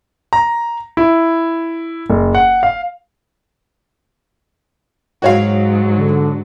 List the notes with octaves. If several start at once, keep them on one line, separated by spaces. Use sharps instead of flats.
A#5
E4
F#1
F#5
F5
G#2 F#3 F#4 C#5 F5
D3